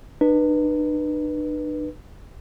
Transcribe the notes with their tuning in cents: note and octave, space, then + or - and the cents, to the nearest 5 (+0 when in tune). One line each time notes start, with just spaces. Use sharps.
D4 +45 B4 -15